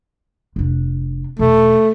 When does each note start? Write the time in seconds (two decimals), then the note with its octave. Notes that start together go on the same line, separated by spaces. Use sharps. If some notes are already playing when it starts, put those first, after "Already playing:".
0.56 F1 D4
1.39 E1 A3